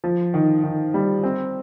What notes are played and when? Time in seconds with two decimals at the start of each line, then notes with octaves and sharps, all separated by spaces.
0.04 F3
0.34 D#3
0.63 D#3
0.94 G3
1.23 C4